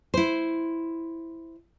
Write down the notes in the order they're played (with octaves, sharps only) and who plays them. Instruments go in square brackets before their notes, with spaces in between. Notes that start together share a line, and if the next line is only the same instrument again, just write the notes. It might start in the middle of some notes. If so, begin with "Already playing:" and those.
[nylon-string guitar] E4 C5